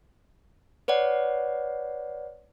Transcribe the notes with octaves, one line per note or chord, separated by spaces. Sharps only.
B4 C#5 D5 F#5